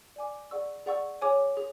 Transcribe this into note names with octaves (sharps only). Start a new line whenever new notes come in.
D5 G#5 D6
G#4 D5 F#5 C#6 E6
G#4 D5 F#5 C#6 E6
G#4 C#5 G#5 D6
G#4